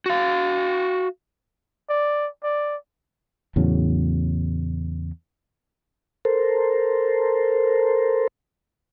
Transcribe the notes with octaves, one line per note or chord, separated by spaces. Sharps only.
F#4 F5
D5
D5
E2 A2 C#3 F#3
A4 A#4 C5